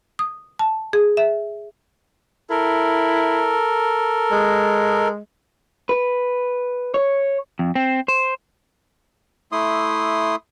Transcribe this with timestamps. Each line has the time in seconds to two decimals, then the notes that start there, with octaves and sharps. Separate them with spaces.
0.19 D#6
0.59 A5
0.93 G#4
1.17 E5
2.50 E4 A4 A#4
4.31 G#3
5.89 B4
6.94 C#5
7.59 F2
7.75 C4
8.08 C5
9.52 A3 E4 C6 D#6